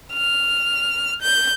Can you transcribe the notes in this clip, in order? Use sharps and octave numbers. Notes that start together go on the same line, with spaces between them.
F6
G6